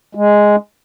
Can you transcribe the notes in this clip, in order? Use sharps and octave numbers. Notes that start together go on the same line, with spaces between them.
G#3